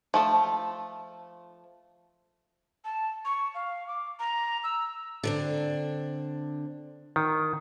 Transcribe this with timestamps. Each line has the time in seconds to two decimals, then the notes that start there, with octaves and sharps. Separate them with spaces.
0.14 F3 A3 A4
2.85 A5
3.25 C#6
3.55 F5
3.87 D6
4.19 A#5
4.64 E6
5.23 D3 C4 D4
7.16 D#3